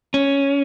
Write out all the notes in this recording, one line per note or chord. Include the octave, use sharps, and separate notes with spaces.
C#4